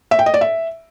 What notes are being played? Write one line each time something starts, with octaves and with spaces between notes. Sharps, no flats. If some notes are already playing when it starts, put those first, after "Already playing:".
E5
G5
D#5
D5
E5